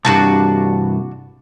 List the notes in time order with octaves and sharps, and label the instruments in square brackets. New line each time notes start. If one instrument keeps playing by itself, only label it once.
[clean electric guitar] C2 G2 [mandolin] D4 F#4 A5